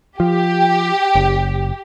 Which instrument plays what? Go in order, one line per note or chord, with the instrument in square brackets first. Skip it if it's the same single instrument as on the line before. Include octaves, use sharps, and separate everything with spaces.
[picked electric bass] F3 [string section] G4
[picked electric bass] F#1